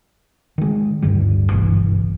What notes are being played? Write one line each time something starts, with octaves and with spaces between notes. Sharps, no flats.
D#3 G#3
D1 G2 D3 G3
F#1 B1 G2 E3